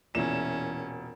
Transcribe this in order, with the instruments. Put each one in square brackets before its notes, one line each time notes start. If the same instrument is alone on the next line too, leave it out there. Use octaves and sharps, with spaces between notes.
[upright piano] E1 E7 [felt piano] E2 [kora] A#2 E5 [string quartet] C#4